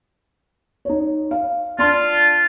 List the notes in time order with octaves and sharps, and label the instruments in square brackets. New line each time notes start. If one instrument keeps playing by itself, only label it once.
[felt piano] D#4 C#5
F5
[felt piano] D4 A5 C6 [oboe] F4